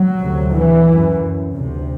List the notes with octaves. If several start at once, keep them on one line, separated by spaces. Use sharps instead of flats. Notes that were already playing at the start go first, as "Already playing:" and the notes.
Already playing: F#3
D2 C3
E3
F#2
D2 C3